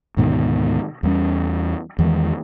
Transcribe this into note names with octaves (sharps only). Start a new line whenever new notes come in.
D2 G#2 B2 D#3
E2 G3 C#4
E2 D#3 E3 G#3